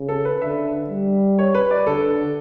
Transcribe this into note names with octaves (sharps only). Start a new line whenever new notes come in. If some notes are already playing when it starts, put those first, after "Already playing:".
Already playing: C#3
A4
B4
D3 E5
G3
C#5
B4
D5
D3 A4